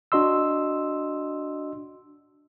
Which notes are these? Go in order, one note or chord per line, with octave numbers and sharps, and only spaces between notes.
D4 F#4 D#5 C6 E6